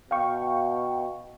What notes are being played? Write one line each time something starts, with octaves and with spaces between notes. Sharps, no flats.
B2 F5 G5 C#6